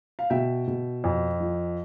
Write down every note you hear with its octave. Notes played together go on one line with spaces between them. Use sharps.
F5
B2 E5 G5
B2
F2
F3